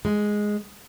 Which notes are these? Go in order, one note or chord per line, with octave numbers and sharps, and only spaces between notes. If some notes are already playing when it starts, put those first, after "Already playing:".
G#3